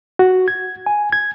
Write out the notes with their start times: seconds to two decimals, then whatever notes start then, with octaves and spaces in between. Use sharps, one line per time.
0.19 F#4
0.48 G#6
0.86 G#5
1.13 G#6